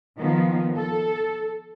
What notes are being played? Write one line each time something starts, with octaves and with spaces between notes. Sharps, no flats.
D#3 F3 B3
A4